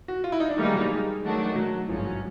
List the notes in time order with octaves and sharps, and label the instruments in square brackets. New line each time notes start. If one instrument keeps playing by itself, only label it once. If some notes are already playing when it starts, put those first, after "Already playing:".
[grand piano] F#4
F4
E4
D#4
D4
[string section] D#3 G3 A#3 D#4 [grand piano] A3
[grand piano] G#3
F#3
G3
G#3
[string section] D#3 F#3 A3 D4 F#4
[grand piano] F#3
[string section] G#1 G2 E3 G#3 C#4 [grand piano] F3
[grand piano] F#3